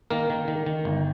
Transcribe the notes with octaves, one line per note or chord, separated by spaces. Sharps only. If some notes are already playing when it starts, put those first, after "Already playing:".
D#3 A#3 A#4
D#3
D#3
D#3
G1